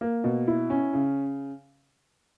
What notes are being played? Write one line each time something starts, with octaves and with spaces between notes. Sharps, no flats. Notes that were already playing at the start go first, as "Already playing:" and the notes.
A#3
B2
E4
C#4
C#3